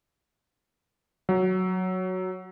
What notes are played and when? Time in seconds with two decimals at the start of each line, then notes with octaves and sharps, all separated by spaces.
1.29 F#3